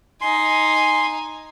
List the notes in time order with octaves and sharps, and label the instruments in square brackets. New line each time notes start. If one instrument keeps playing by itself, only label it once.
[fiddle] D#4 G#5 [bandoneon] C6